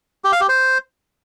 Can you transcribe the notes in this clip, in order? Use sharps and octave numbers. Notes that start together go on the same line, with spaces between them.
G4
F5
G4
C5